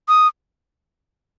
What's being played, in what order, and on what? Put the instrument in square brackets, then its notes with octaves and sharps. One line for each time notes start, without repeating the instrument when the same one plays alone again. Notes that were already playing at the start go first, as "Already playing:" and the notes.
[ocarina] D#6